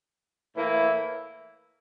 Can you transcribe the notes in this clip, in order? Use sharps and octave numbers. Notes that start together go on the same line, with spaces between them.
A2 E3 A#3 E4